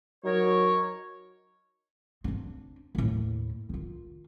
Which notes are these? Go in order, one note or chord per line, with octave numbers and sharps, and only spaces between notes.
F#3 D#4 A#4 C#5
C4 D4
D#2 A2
D#3 F4